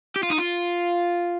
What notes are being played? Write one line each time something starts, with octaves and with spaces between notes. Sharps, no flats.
G4
F4
D#4
F4